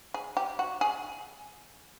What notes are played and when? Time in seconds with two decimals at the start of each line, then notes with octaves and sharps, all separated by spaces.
0.14 G#4
0.37 G4
0.59 F#4
0.81 G#4